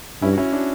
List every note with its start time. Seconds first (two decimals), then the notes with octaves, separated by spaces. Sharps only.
0.22 G2 C#4 E4
0.33 F#4
0.38 C#4 E4
0.53 D4 F#4